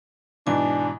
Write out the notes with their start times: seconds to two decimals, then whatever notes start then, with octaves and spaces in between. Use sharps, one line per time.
0.47 G#2 B2 E3 D4 G#5